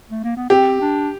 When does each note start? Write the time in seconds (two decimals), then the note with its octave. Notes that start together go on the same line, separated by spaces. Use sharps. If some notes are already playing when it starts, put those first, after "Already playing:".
0.10 A3
0.24 A#3
0.37 B3
0.50 C4 G4
0.81 D4